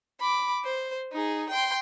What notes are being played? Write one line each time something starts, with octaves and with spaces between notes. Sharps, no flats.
B5 D6
C5
D#4 G#4
G5 C6